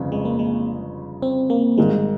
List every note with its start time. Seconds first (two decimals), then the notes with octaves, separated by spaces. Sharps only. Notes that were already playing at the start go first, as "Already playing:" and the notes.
Already playing: G1 F2 C#3 C4
0.12 G#3
0.25 A#3
0.39 G#3
1.22 C4
1.50 A#3
1.78 G#1 G#2 D#3 G3 G#3